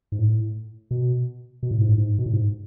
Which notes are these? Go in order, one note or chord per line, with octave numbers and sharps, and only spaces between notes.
G#2
A2
B2
B2
A2
G#2
A2
G#2
B2
A2
G#2